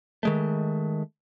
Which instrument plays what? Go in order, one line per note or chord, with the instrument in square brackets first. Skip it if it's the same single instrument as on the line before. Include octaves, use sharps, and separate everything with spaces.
[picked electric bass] D#3 G#3 A3